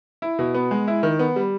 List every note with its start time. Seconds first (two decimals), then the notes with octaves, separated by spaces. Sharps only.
0.22 E4
0.39 B2
0.54 B3
0.71 G#3
0.88 E4
1.03 D#3
1.19 B3
1.36 G3